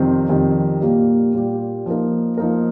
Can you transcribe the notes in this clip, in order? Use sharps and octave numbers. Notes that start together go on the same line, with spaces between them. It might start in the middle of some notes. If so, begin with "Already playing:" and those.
Already playing: F2 C3 D#3 G3 C4
F2 C3 D#3 G3 C4
A#2 G3 A#3 G4
A#2 G3 A#3 G4
F3 A#3 D#4 A#4
F3 A#3 D#4 A#4